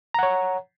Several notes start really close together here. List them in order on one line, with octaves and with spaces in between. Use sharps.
A#5 F#5 C#5